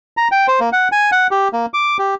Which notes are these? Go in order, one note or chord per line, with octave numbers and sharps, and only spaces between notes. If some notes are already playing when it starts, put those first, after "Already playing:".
A#5
G5
C5
A#3
F#5
G#5
F#5
G4
A#3
D6
G4